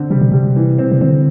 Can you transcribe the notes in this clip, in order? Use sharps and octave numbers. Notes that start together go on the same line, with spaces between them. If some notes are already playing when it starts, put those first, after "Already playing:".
Already playing: D3 C4
C3 G3
B2
C3 G3
E3
C4
C3
D3 C4